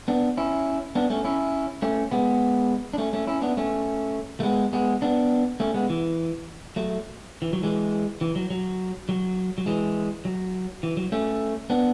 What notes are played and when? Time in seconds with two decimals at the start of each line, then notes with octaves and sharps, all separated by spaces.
0.08 B3 D4
0.37 C#4 E4
0.95 B3 D4
1.10 A3 C#4
1.25 C#4 E4
1.82 A3 C#4
2.11 G#3 B3
2.93 D4
2.98 A3 C#4
3.13 A3 C#4
3.27 C#4 E4
3.42 B3 D4
3.57 A3 C#4
4.40 A3
4.43 G#3 B3
4.73 G#3 B3
5.02 B3 D4
5.60 A3 C#4
5.74 G#3 B3
5.90 E3
6.76 F#3 A3
7.42 E3
7.53 F#3
7.63 E3 G#3
8.21 E3
8.36 F#3
8.50 F#3
9.09 F#3
9.58 F#3
9.66 E3 G#3
10.25 F#3
10.83 E3
10.97 F#3
11.12 A3 C#4
11.70 B3 D4